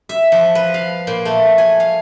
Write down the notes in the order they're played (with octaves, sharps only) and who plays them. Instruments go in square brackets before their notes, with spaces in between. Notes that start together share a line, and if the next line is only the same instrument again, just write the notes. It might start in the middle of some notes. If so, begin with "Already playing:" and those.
[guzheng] E5
F3
B4
F5
A#2
A3
G#5
F5